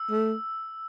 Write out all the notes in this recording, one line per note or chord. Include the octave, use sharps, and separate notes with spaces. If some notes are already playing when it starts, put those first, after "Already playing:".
Already playing: E6
A3